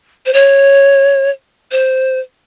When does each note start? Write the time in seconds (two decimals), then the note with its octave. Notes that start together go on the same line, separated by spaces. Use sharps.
0.26 C5
0.33 C#5
1.72 C5